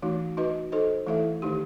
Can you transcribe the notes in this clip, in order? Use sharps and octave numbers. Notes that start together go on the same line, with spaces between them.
E3 A3 D#4 F#4
D#4 F#4 B4 D#5
D#4 A4 C5 D#5
E3 A3 E4 A4 E5
D#3 A3 D#4 G4